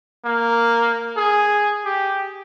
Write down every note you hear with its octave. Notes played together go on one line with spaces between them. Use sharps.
A#3
G#4
G4